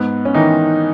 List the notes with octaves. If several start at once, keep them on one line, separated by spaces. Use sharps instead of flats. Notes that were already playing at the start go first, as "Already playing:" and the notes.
Already playing: G#2 B3
C#4
D#3 E3 D#4